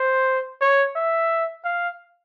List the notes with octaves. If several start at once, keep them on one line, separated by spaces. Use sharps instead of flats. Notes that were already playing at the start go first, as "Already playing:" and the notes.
Already playing: C5
C#5
E5
F5